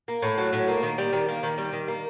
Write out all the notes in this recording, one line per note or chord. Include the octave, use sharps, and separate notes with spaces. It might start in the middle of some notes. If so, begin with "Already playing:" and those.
A#3
A2
F#3
A2
A#3
D#3
G3
D#3
A#3
D#3
G3
D#3
A#3